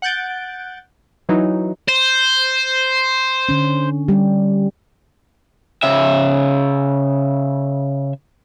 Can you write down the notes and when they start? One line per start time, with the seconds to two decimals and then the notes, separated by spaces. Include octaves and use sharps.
0.02 F#5 F#6 G6 A6 D7
1.29 E3 F#3 D#4
1.89 C5
3.49 D3 C#4
4.08 G3 G4
5.83 C#3 E5